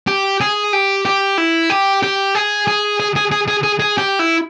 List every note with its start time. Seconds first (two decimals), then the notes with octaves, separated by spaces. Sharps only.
0.07 G4
0.40 G#4
0.73 G4
1.05 G4
1.38 E4
1.70 G4
2.03 G4
2.35 G#4
2.68 G#4
3.00 G#4
3.16 G#4
3.32 G#4
3.48 G#4
3.64 G#4
3.80 G#4
3.98 G4
4.19 E4